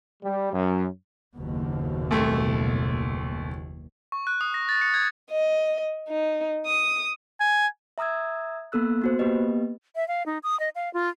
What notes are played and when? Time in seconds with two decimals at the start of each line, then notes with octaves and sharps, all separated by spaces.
0.23 G3
0.53 F#2
1.33 F#1 D#2 B2
2.11 C2 A3
4.12 C#6
4.27 F#6
4.41 D#6
4.54 A#6
4.69 A6
4.81 C#7
4.94 G#6
5.31 D#5
6.09 D#4
6.66 D#6
7.40 G#5
7.98 E5 A#5 D#6 E6 G#6
8.72 A#3 B3 A4 E6 F#6
9.02 B3 F#4 C5
9.19 A#3 B3 G4 B4 D#5
9.96 E5
10.08 F5
10.26 D#4
10.43 D#6
10.60 D#5
10.75 F5
10.94 F4